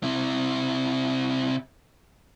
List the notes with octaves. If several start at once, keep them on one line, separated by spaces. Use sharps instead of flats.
C3 E4